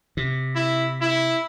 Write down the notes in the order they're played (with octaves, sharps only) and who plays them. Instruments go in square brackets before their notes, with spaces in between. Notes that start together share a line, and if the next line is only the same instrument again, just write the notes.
[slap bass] C3
[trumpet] E4
E4